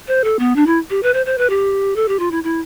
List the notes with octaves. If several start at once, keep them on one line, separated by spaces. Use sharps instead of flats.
C5
A4
B3
D4
E4
G4
B4
C5
C5
B4
G4
A4
G4
F4
E4
E4